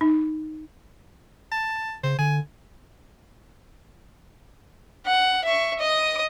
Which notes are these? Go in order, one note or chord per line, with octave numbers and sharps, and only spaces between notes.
D#4
A5
C#3 C5
D3 G#5
F#5
E5 C#6
D#5 D#6